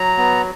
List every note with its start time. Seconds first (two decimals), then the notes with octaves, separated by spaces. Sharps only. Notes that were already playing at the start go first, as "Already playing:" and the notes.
Already playing: F#3 A#5
0.18 B3